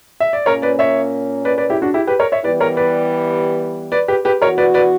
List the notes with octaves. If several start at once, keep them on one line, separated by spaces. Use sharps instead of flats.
E5
D5
A#2 A#3 C#4 A#4 C#5
B4 D5
C#5 E5
B4 D5
B4 D5
E4 G4
D4 F#4
E4 G4
G4 B4
A#4 C#5
C#5 E5
E3 G3 B3 E4 G4 B4 D5
A#4 C#5
B4 D5
B4 D5
G4 B4
G4 B4
E3 B3 F#4 A#4 C#5
B4 D5
B4 D5